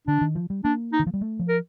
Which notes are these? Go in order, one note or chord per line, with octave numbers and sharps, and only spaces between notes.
D3 D4
D#3
F3
G3
A#3 D4
D#4
D#3
F3
G3
A3
F3
A#4